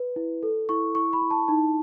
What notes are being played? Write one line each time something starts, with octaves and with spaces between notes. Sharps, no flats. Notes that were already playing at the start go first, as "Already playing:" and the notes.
Already playing: B4
E4
A4
E4 C#6
E4 C#6
B5
E4
A5
D#4 A5